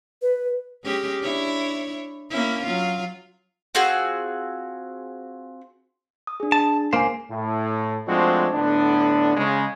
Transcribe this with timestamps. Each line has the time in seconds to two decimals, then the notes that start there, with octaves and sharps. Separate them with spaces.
0.22 B4
0.84 G#3 C#4 G4
1.22 D4 E4 C#5
2.30 A#3 C#4 E4
2.63 F#3 F4
3.75 C4 F4 F#4 G#4
6.27 D#6
6.40 D4 G#4
6.52 A5
6.93 C#2 A#3 C5 F5 G#5
7.31 A2
8.08 F3 G#3 A3 C4 D4 F#4
8.54 A2 D3 B3 D4
9.37 C#3 G#3